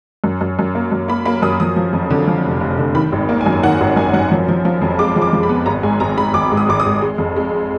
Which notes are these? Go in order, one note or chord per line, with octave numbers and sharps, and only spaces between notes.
F#2
F#2
F#2
A#3
F#2
A#3 B5
A#3 B5
F#2 D#6
F3 D#6
F3
F2
D3
F3
F1
F1
D3
D#3 B5
G#1
A#3
G#5
F#2
D#3 F#5
G#1
F#2 G#5
F#2 F#5
F3
F3
F3
F2
G#3 D6
F3
D6
F3
B5
B3
G#1 A#5
G#2 G#5
G#1 A#5
G#2 B5
G#1 D6
G#2
D#6
G#1 D6
D#6
G#2
G#3
F2
G#3